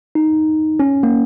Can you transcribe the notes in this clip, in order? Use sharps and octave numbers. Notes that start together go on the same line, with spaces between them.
D#4
C#4
A#3